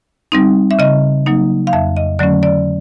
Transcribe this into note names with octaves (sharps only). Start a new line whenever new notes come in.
G3 C4 D#4
E5
C#3 D#5
F#3 A#3 D#4
F5
F2 E5
D#5
D3 F#3 A3 C#4 D5
D5